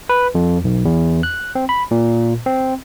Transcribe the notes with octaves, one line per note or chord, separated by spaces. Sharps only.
B4
F2
B1
E2
F#6
C4
B5
A#2
C4